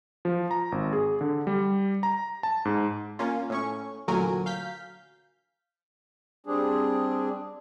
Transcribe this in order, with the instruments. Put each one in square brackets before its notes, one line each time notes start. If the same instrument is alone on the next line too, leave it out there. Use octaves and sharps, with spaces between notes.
[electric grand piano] F3
A#5
G#1
G#4
D3
G3
A#5
A5
G#2
[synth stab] A#3 C#4 F4
A2 C#4 C#6
A1 D2 A#2 F#3 A#4 G#5
F5 G6 B6
[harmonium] G3 C4 D4 G#4